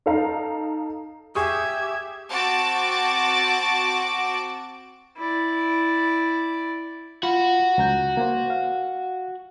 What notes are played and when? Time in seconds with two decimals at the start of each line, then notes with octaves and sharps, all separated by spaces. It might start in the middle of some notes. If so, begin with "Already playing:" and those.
0.06 D#4 A4 F5 A#5
1.35 G4 G#4 E5 C#6 D#6 G#6
2.29 C4 F#4 A5 D6 A6 D7
5.17 E4 D5
7.23 F4 F#4 B5
7.78 C#2 A#5 G6
8.17 A#3 C5
8.50 F5